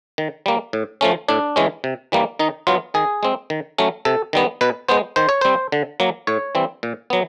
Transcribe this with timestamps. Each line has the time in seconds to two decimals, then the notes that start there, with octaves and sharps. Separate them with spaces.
0.18 D#3
0.46 G3 A#3
0.73 A2
1.01 F3 A3 C#4
1.28 A2 D4
1.56 E3 G#3 C#4
1.84 C3
2.12 E3 G3 A#3
2.39 D#3 D#4
2.67 F#3 B3 F4
2.94 D#3 G#4
3.23 G#3 C4
3.50 D#3
3.78 F#3 A3 C#4
4.05 C3 A4
4.33 D#3 G3 B3
4.61 B2 B4
4.88 G#3 B3 C5
5.16 D#3 C5
5.29 C#5
5.41 G3 C4 C5
5.72 D3
6.00 F#3 A#3
6.27 A2 C#5
6.55 E3 G3 C4
6.83 A#2
7.10 F#3 B3